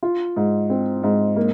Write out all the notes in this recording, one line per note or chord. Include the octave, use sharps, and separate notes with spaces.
F4
G#2
C4
G#2
A#3